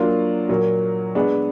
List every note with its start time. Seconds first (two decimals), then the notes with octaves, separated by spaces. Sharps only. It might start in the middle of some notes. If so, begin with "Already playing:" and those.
Already playing: F#3 A#3 D4 F4
0.49 A#2 F#3 A#3
1.15 G#3 B3 D4 G#4